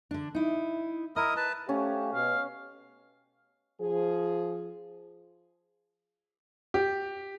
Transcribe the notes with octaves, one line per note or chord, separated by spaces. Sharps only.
D3 D4
D#4 E4
E4 A#4 D#5 D#6
B4 A5
A3 C#4 G4 F5
B2 F5
F3 G#4
G4